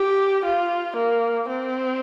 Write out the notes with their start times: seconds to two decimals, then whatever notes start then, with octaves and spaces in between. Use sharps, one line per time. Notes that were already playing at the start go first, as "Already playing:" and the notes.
Already playing: G4
0.45 F4
0.96 A#3
1.49 C4